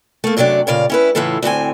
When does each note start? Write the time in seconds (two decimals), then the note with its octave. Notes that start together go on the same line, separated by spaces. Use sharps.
0.24 A3 A#3
0.37 F#2 C3 F#3 D4 D5
0.67 A#2 C#3 D5 F5
0.90 C#4 E4 B4
1.15 A2 C#3 E3 E4 F4 A4
1.42 D2 A2 C4 G#5